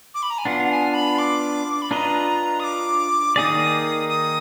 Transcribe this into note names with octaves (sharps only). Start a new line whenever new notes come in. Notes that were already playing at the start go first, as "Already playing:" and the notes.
D6
B5
A#5
G#5
B3 D4 F4 F#5
F#5
G#5
B5
D6
B5
D4 F4 B4 D#5 A#5
D#6
D6
D#3 A#3 D#4 G#4 D5 D#6
D#6